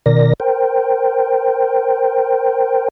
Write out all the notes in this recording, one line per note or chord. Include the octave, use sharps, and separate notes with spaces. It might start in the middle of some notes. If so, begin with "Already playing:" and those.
B2 D#3 A#4 D5 A#6
A#4 C5 G5